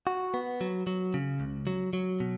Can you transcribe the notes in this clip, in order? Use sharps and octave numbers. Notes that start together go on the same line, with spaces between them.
F#4
B3
F#3
F#3
C#3
C#2
F#3
F#3
B2